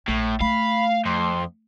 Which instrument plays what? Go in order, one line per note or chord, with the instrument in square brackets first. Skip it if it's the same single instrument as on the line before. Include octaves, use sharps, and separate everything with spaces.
[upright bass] A#1 [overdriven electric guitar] A2
[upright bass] A3 [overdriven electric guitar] F5 [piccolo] B5
[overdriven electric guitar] F2 [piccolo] C6